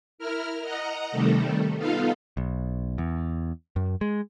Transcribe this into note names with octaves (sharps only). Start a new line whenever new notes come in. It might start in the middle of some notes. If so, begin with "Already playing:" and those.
E4 A#4 F6
D#5 F#5 A#5
C3 D#3 G3 A3 A4
B3 D#4 F4 A4 F5
B1
E2
F#2
G#3